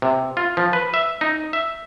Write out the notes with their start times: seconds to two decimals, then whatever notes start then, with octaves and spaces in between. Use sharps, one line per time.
0.02 C3
0.37 F4
0.57 F3
0.73 B4
0.94 E5
1.21 D#4
1.53 E5